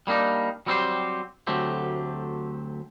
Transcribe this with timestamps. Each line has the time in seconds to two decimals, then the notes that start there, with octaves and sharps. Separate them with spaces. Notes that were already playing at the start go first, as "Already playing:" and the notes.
0.07 G3 A#3 D4 D#4
0.66 F#3 G3 C4 F4 G4 C5
1.47 D2 F#3 A3 C4 G4